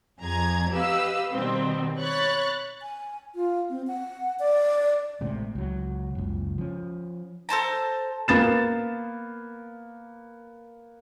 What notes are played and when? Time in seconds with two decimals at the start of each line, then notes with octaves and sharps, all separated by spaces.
0.21 F2 G#4 A#5 G#6
0.72 G4 B4 D#5 F5 E6
1.33 B2 D#3 G3 B3 C4
2.00 C#5 B5 C#6 F#6 A6
2.82 G#5
3.35 F4
3.70 C4
3.87 F#5
4.39 D5
5.21 A1 A2 C3 G#3
5.55 C#2 F#3
6.15 F#1 C#2
6.58 F3 C#4
7.49 A4 C5 A5 A#5
8.28 A#3 B3 A6 E7